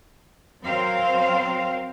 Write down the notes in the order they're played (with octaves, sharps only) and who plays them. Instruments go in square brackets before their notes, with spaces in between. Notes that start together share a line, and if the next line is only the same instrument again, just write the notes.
[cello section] F#3 C4 A#4 C5 F5